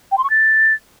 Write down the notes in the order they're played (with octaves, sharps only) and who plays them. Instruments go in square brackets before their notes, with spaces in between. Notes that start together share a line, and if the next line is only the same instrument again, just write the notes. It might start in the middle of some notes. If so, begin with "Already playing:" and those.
[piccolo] G5
C6
C#6
A6